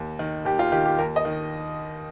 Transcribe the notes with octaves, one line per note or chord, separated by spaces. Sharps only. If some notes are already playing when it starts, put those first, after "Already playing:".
Already playing: D#2
D#3
D#2 G4
F4
D#3 G4
G4
D#2 A#4
D#5
D#3